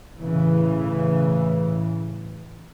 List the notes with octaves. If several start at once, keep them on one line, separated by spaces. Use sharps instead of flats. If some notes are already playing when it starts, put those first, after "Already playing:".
A2 C#3 E3